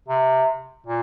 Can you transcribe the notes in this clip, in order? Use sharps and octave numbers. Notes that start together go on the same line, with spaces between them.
C3
A#2